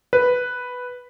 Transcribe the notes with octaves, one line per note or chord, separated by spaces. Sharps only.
B4